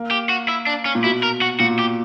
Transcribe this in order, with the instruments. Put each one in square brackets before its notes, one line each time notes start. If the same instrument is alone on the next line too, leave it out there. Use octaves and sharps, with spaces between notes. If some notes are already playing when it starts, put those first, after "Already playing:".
Already playing: [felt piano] A#3
[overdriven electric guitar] G4
F#4
E4
D4
C#4
[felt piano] A#2
[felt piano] B2 [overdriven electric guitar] E4
[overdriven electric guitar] A#4
F#4
[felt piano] A#2 [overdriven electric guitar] F#4
[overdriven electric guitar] G4